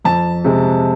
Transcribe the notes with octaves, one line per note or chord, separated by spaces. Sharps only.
F2 A5
C3 G#3